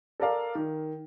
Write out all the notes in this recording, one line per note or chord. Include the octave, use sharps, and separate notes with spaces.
A4 A#4 D5 F5
D#3